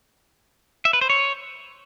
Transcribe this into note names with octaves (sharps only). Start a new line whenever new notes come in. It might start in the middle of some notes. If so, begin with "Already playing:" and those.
E5
B4
C5
C#5